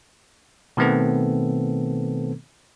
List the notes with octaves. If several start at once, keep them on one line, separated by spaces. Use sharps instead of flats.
B2 D#3 A3 B3 C4 A4